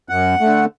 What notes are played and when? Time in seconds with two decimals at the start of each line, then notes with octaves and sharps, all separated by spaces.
0.09 F#2 F#5
0.40 D3 A3